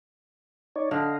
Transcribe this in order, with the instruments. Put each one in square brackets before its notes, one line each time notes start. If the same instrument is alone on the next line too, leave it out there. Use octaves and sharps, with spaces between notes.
[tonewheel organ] D#4 C#5 D5
[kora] D3 D4 [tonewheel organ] D#5 F5